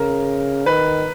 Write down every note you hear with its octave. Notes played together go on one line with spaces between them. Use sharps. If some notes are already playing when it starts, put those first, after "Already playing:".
Already playing: C#3 A#4
D#3 B4